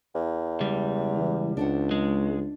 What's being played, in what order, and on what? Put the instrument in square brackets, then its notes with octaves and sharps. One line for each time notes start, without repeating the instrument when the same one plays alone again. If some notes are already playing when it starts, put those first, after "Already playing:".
[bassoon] E2
[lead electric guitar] C#2 G3
[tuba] E3
[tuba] C#2 [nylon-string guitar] D4 C5 F#5
[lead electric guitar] G#3